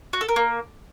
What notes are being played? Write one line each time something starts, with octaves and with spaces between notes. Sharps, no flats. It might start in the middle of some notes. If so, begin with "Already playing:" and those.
F#4
A4
A#4
A#3